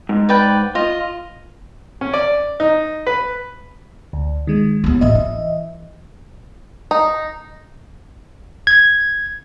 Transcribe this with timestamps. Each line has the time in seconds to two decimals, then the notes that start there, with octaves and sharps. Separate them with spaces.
0.09 G#2
0.29 B4 D5 G5
0.75 F4 D#5
2.01 C#4
2.14 D5
2.60 D#4
3.06 B4
4.13 D2
4.47 D#3 G#3
4.84 D#2 B3
5.01 A1 E2 D#5 E5
5.15 E3
6.91 D#4
8.67 G#6